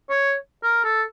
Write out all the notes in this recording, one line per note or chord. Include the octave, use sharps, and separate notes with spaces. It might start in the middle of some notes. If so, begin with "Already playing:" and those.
C#5
A#4
A4